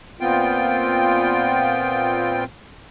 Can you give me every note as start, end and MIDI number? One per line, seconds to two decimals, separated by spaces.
0.21 2.44 46
0.21 2.44 59
0.21 2.44 60
0.21 2.44 65
0.21 2.44 79